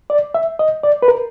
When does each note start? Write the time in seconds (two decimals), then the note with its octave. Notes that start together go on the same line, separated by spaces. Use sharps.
0.10 D5
0.35 E5
0.59 D#5
0.83 D5
1.03 B4
1.08 A#4